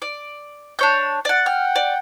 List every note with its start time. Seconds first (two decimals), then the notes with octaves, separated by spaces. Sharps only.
0.02 D5
0.79 D4 C#5 G6
1.25 D5 F#5
1.46 F#5 G5 F6
1.76 D5